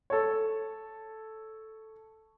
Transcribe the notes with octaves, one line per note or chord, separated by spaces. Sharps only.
A4 C#5